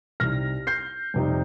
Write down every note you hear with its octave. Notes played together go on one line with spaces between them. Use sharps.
C2 C3 G3 D#4 F6 A#6
G6 C7
F2 C3 G3 C4 D#4